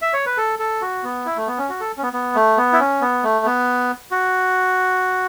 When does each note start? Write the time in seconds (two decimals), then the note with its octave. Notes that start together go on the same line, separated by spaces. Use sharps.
0.02 E5
0.13 C#5
0.26 B4
0.37 A4
0.59 A4
0.81 F#4
1.04 B3
1.26 E4
1.36 A3
1.47 B3
1.58 C#4
1.69 F#4
1.80 A4
1.97 C#4
2.03 B3
2.13 B3
2.35 A3
2.57 B3
2.73 E4
2.80 C#4
3.01 B3
3.24 A3
3.45 B3
4.11 F#4